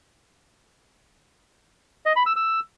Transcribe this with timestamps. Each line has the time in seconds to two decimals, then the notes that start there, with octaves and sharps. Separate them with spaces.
2.06 D#5
2.16 B5
2.26 E6
2.36 E6